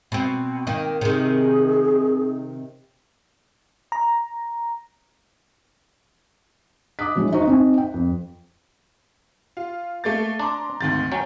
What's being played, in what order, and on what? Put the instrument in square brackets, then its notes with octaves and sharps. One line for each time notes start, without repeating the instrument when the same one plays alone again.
[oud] B2 C4 [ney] G5
[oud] D#3 A#3
[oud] C3 D#3 [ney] G#4
[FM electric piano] A#5
[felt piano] D6 D#6 F#6 B6
E3 F#3 G#3 C#4 D4 F#4
D#4 F#4 C5 A#5 C#6
C4 D#4
G5
F2
[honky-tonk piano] F4
A3 A#3 A6
[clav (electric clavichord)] D4 [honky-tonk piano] A#5 C6 D6
[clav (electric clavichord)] G#1 [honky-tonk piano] D2 D#3 A6
[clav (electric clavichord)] F#3 C#4 [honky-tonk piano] G5